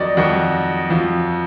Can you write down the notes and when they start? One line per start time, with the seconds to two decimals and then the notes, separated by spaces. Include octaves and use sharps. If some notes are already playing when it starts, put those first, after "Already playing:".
Already playing: F2 D#3 F#3 D5 D#5
0.17 F2 D#3 F#3 F#4
0.90 F2 F3